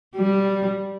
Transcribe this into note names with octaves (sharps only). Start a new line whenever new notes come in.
G3